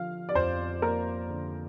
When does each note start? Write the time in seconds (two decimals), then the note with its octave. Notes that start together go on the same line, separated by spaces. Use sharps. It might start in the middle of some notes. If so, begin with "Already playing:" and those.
Already playing: D3 F3 F5
0.29 D5
0.35 F2 C5
0.82 A#3 A#4
1.29 D3